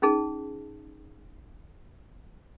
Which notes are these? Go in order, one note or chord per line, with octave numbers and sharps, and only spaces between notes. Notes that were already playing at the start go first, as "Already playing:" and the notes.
C#4 D#4 G#4 A5